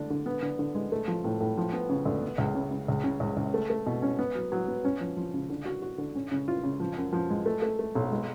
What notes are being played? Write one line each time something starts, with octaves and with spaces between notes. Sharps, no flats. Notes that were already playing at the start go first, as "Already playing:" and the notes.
Already playing: D2 D3 D4
D3
B3
D3
D3
G#3
A3
F3
A2
A2
F3
B3
C#3
D2
B3
C#2
C#3
C#3
C#2
C#3
C#2
C#2
A3
A3
B2
C#4
B3
F#3
F#3
B3
C#4
F3
F3
C#3
D3
F#4
F#4
D3
C#4
C#3
F4
C#3
F3
F#2
F3
G#3
A3
A3
A3
B1
G#3